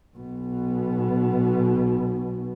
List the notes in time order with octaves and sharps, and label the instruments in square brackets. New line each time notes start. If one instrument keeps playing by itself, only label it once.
[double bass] B1 B2